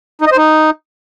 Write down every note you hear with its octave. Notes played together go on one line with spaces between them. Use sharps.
D#4
D#5
C5
D#4